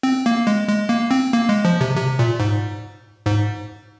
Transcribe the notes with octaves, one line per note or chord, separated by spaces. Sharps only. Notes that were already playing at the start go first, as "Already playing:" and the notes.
C4
A#3
G#3
G#3
A#3
C4
A#3
G#3
F3
C3
C3
A#2
G#2
G#2